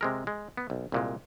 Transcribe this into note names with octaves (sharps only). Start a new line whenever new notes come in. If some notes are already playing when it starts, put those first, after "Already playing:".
C3 G#3 A#4
G#3
B3
B1
C2 A#2 G#3